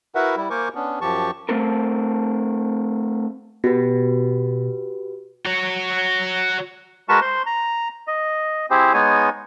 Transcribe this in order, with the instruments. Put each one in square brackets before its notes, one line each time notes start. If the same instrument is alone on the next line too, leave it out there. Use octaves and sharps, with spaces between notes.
[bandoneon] E4 F#4 A#4 B4 E5 F#5
G3 E4
A#3 A#4 C5 G#5 C#6 D6
B3 C#4 D4
F#2 F3 G4 A5 C#6
[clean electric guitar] A3 C4 A4 A#4
[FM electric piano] B2 [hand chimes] F#4 G4 B4
[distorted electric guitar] F#4 C#5
[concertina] G#3 F#4 A#4 B4 A5 C#6
C5 C6
A#5
D#5
C4 E4 G4 G#4 C5
G#3 B3 D#4 C#5 G#5